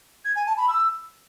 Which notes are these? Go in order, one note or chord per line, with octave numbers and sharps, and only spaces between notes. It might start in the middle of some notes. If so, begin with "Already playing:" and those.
G#6
G#5
A5
B5
E6